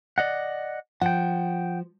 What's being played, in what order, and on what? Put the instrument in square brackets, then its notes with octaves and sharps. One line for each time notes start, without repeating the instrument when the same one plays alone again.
[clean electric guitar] D5 D#5 F#5
[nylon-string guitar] F3 [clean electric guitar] F#5 G5